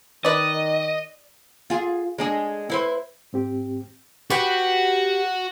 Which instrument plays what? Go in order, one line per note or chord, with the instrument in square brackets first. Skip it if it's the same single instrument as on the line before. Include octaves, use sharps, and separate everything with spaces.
[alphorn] D#3 [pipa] B4 D5 [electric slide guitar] D#5
[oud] F4 G#4
G#3 D4 G#4
E4 B4 C5
[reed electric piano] G#2 C4 G4
[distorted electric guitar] F#4 [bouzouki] G4 B4 G5